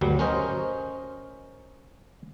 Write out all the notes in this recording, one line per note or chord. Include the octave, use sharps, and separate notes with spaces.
D2 G2 F#3 G3
C#4 A#4 C5 D#5